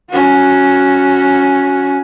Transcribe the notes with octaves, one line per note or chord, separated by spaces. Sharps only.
C#4 F#4